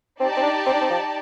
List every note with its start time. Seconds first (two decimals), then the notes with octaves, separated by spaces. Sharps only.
0.20 C4 D#4 G4 D5 A5
0.37 C4
0.43 D4
0.66 C4
0.73 D4
0.81 C4
0.90 F3